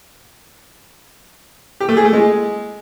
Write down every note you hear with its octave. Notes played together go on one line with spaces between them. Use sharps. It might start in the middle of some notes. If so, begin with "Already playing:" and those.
G4
A3
G#4
A3
G#3